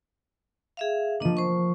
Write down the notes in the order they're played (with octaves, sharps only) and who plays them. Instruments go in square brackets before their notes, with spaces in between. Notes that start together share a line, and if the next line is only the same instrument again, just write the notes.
[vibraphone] G#4 E5 F5
[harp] F3 A#3 [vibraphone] D4 D#5
[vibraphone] C5 C#6